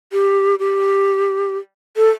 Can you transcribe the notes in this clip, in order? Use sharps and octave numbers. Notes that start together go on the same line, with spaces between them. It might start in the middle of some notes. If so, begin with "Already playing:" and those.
G4
G4
A4